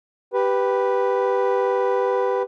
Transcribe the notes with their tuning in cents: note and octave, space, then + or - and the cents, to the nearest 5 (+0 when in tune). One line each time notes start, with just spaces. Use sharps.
G4 +0 B4 +0